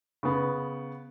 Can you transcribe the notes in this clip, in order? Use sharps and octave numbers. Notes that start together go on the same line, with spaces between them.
C#3 B3